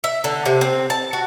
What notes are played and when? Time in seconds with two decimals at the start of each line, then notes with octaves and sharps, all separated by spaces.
0.04 E5
0.24 D3
0.46 C3
0.61 C4
0.90 A5
1.13 F#4